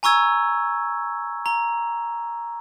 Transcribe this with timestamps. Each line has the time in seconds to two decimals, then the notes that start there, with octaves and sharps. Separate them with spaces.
0.03 G#5 A#5 C#6 E6 G#6
1.46 A#5